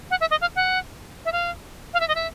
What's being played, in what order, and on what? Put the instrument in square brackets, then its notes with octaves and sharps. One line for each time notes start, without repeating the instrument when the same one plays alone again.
[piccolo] F#5
E5
D#5
F5
F#5
E5
F5
F5
E5
D#5
E5